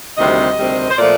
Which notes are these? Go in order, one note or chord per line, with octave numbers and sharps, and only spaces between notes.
D2 C3 D#3 G3 C4 D#5
D2 C3 D#3 G3 C4
C5
A#2 F3 A3 D5